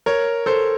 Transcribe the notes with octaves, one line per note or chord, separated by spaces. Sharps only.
A#4 C#5
A4 C5